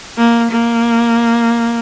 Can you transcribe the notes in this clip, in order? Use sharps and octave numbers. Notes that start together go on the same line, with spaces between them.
A#3
A#3